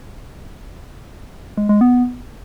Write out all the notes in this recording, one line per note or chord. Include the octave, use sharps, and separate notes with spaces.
G#3
G#3
B3